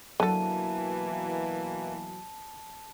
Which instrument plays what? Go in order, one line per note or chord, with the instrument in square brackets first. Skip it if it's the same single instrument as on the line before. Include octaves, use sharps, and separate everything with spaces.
[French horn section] B2 E3 A#3 [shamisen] D3 A4 [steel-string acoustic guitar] F#3 [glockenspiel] A5